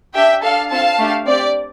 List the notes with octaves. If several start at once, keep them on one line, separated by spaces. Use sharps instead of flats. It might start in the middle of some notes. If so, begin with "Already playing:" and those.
D4 G4 E5 G5
D4 A4 F5 A5
C4 F4 A4 F5 A5
A3 D4 G4
C4 G4 D5